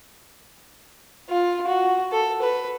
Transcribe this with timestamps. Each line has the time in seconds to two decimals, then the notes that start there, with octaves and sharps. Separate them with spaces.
1.30 F4
1.67 F#4
2.12 A4
2.42 B4